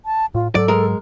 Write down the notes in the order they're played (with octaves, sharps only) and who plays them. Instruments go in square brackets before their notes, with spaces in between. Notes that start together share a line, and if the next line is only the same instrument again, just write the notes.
[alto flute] A5
[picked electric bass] A2 [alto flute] F4
[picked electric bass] G#2 F#3 [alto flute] A4 [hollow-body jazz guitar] D5
[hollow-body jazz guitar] G#3 A#4